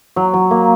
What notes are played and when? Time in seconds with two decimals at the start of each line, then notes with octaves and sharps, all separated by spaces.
0.16 F#3
0.34 F#3
0.51 A#3